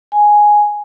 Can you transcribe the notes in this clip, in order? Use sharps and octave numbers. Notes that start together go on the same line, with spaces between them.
G#5